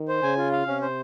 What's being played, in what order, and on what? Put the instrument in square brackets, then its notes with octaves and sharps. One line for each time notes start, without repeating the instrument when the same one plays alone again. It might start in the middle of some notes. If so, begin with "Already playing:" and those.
Already playing: [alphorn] D#3
[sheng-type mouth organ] C5
[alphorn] C#3 [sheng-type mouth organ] G#5
[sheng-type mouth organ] F4
F5
[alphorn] C3 [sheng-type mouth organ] C#4
[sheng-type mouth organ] C5